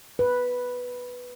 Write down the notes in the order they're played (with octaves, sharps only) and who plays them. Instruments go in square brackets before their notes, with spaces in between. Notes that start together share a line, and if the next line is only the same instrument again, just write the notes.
[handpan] B4